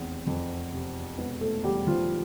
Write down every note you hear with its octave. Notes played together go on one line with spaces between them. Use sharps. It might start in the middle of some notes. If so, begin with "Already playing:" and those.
Already playing: F1 E2 C4
F2
C3
E1 B3 B4
A3 A4
E2 G3 G4
F3 F4